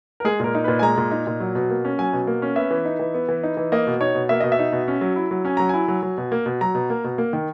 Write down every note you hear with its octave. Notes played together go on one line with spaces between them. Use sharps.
A#4
G#3 G#4
A#2 A#4
D#4
A#2 B4
G#5
G#3 A#5
A#2
D#4
A#2
F#3
B2
A#3
C#4
F#3 G#5
B2
A#3
C#4
B3 E5
E3
D#4
E3
B3
E3
D#4
E3
A#3 D#5
B2
D#4 C#5
B2
A#3 E5
B2 D#5
E5
D#4
B2
C#4
F#3
E4
F#3
C#4 G#5
F#3 A#5
E4 G#5
F#3
F#3
B2
A#3
B2
F#3 A#5
B2
A#3
B2
A#3
D#3